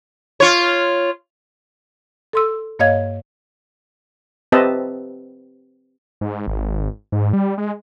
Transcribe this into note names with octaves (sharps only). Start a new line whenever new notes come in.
F4 C#5
A4 C6 E6
G2 A#3 C#5 D#5 F5 G#6
C4 G4 B4 D#5 E5 A5
G#2
G#1
G#2
G3
G#3